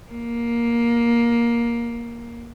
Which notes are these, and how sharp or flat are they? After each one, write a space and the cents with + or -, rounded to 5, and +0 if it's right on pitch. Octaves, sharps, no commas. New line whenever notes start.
A#3 +10